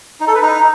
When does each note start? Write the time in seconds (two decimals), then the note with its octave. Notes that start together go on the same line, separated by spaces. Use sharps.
0.20 D#4
0.28 A4
0.35 B4
0.42 D#4